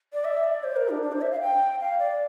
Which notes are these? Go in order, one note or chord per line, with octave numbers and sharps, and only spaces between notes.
D5
E5
D5
C5
A#4
D4
D4
C5
E5
F5
G5
F5
D5